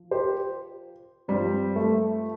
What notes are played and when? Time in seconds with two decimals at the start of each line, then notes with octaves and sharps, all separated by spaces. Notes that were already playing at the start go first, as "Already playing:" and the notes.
Already playing: F3
0.11 G4 C5
1.28 G2 F3 G3 C4
1.76 A3